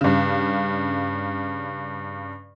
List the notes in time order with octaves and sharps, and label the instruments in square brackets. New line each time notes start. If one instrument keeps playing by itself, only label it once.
[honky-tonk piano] G2 C#3